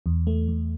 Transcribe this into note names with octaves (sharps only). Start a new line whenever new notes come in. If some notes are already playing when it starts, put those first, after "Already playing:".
E2
A3
E2